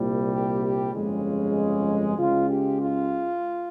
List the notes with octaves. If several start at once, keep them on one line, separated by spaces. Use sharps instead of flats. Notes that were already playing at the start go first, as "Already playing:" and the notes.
Already playing: C2 A#2 G3
G4
G4
G1 F2 C#3 G#3
C#2 C#3 G#3 F4
G4
F4